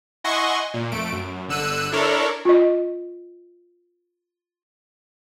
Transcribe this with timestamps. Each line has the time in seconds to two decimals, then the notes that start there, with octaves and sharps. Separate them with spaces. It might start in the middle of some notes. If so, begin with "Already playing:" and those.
0.24 E4 D#5 F#5 G#5 C6 C#6
0.74 A#2
0.92 F2 A3 D7
1.12 F#2
1.48 G1 D3 E6 F#6 D#7
1.92 D4 E4 A4 A#4 C#5 D5
2.45 F4 D#5